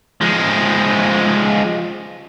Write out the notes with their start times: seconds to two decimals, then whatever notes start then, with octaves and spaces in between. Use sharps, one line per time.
0.21 F3 G#3